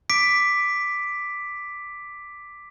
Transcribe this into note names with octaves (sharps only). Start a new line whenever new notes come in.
D6 B6 D7